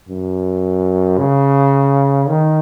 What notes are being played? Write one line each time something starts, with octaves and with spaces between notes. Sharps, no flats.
F#2
C#3
D#3